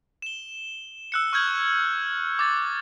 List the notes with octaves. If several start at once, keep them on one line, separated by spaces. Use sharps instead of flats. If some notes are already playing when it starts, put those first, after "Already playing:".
E7 G7
E6 F#6 C#7
C#6 F6 G6 G#6 F#7
D6 A6